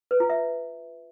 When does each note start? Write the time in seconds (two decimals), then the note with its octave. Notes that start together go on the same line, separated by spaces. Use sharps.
0.11 B4
0.20 F4
0.30 E5